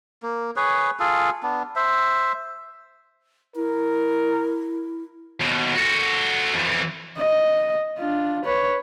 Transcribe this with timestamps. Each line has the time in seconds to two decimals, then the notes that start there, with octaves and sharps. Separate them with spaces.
0.23 A#3
0.56 G#4 B4 C#5
0.99 F4 G#4 A4
1.43 B3 D4
1.76 C5 E5
3.56 E4 A#4
5.40 D#2 B2
5.75 F#4 A4
6.54 F2 E3
7.17 D#5
7.99 D4 F4
8.45 B4 C#5